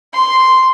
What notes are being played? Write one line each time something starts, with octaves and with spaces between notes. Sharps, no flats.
C6